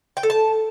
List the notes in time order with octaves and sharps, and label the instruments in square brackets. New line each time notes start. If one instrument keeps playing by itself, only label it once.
[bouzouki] G5
A4
A5